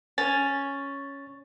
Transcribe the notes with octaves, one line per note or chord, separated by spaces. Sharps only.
C#4 A6